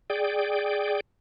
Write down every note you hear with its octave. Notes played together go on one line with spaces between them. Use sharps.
G#4 D5 G5